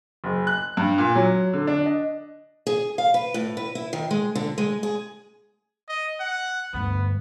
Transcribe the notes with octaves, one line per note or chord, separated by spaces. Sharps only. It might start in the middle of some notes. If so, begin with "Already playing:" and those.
F#1
F#6
G2
A#2
F#3
D3
D4
D#5
G#4
F5
B4
A2
B4
E4
D#3
G#3
D3
G#3
G#4
D#5
F#5
D2 G2 B3